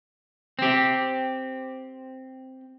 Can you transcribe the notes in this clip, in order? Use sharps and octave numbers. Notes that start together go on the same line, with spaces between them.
C4 G4